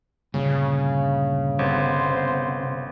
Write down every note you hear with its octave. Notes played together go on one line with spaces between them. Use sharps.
D2 G2 A#2 C#3
G1 C3 B3 C5